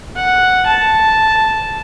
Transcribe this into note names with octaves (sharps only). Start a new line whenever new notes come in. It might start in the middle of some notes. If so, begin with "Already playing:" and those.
F#5
A5